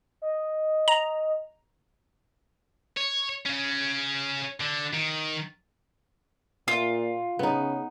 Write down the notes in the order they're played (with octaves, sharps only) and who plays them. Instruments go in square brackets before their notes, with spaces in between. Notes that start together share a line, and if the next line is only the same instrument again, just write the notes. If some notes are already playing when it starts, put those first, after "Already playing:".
[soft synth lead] D#5
[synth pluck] A#5
[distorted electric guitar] C#5
C#3 C#4
D3
D#3
[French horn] A#2 [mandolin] F4
[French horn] C#3 [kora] B3 D#4